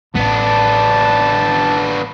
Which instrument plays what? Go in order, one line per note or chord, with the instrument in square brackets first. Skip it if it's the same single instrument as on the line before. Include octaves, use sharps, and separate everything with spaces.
[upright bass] A1 [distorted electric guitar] B3 D4 [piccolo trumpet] A5